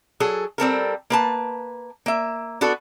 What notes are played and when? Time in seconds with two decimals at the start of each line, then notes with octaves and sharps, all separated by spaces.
0.20 F#3 G#4 A4
0.58 G3 C4 A4 A#4
1.10 A#3 B4 A5
2.06 A#3 E5
2.61 B3 D4 F#4 A4